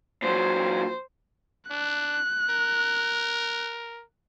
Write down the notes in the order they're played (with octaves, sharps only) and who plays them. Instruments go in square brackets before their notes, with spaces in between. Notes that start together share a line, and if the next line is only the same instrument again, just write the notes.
[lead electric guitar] A#2 F#3 [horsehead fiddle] C5
[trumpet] D4 [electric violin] F#6
[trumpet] A#4